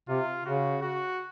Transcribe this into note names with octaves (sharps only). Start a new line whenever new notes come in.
C3 F4
C#3 F#4
F#4